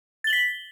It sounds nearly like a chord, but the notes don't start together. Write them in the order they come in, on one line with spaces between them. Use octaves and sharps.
A6 G7 F#7 B6